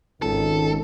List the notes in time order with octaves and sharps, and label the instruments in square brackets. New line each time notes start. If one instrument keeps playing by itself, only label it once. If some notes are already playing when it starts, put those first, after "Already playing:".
[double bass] G#1 [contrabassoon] C#2 [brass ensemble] D#3 [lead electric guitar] A4